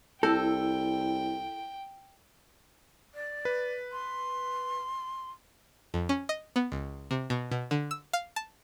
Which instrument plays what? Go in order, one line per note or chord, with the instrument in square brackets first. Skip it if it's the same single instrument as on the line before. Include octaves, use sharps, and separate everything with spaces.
[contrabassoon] C2 [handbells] E4 E6 G6 [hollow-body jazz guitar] A4 [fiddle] G5
[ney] D5
[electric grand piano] B4
[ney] C6
[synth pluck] F2
C#4
D#5
B3
C#2
C3
B2
B2
D3
E6
F5
A5